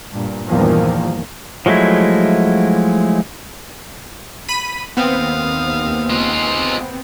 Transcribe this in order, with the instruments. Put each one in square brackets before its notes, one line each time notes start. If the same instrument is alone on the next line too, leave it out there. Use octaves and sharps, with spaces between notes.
[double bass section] G2 A#2
E2 G2 A#2 D#3 F3 A#3
[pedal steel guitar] F3 F#3 G#3 A3 E4
[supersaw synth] B5 B6 D#7
[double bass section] D#2 [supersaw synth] B3 C4 [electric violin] F5 D#6
[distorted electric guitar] G#3 F4